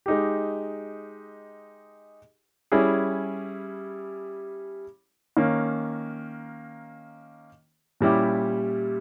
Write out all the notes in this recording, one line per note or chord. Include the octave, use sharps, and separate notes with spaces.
G#3 D#4 G4
G3 C#4 E4 G#4
D#3 A#3 C#4
A#2 G3 C#4 E4 G4